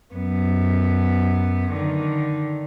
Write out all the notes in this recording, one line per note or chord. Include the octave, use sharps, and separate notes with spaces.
F#2 B3
D3 D#3